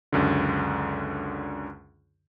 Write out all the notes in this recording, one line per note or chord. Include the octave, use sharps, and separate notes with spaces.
C#2 F#2 D3